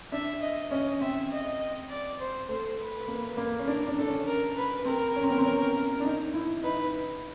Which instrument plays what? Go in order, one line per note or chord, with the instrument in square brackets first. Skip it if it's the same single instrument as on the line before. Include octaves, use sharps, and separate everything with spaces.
[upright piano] D4 [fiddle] E5
[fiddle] D#5
[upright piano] C#4 [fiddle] D#5
[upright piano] C4 [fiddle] E5
[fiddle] D#5
D5
C5
[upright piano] A3 [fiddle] C5
[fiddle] B4
[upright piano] A#3
A#3
C#4
[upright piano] D4 [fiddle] A#4
[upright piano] D4
[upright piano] D4 [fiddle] A4
[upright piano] C#4
[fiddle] A#4
B4
[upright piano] C4 [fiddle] A#4
[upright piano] C#4
C4
B3
C4
C#4
D4
D#4
E4
[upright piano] D#4 [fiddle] B4